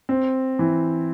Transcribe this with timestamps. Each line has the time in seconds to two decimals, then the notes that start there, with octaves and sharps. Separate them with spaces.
0.09 C4
0.59 E3